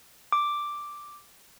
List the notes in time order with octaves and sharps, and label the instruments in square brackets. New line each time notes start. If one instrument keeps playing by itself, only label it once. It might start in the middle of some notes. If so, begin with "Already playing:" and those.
[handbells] D6